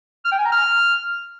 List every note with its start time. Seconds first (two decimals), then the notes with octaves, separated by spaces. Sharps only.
0.25 F6
0.32 G5
0.38 G#5
0.45 A#5
0.52 F6